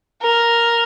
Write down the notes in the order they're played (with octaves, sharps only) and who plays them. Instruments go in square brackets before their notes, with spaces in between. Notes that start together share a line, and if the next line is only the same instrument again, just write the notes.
[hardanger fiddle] A#4